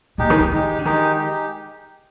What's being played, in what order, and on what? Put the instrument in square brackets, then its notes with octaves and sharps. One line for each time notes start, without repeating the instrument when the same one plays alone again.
[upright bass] A#2 [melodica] G#3 D#4 G4
[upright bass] D#3
D#3
[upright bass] D#3 [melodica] G#3 D#4 G4
[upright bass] D3
[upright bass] D#3 [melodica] G#3 D#4 G4
[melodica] G#3 D#4 G4